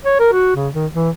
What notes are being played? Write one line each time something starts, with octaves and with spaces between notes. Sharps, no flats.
C#5
A#4
F#4
C#3
D#3
E3